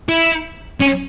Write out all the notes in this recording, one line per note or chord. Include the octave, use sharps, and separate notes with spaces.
E4
C#4